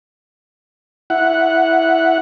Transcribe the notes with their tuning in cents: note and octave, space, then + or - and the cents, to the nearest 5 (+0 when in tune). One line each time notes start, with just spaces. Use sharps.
E4 +0 F#5 +0